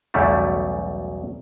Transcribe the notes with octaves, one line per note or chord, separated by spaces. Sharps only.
B1 E2 C#3 F#3 G3 A3